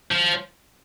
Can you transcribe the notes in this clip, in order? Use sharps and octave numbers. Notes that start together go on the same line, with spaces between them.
F3